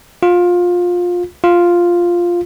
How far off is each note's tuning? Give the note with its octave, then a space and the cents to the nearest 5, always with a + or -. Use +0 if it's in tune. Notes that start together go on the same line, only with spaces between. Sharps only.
F4 +20
F4 +0